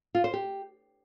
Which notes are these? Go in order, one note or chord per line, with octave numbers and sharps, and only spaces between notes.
F4
C5
G4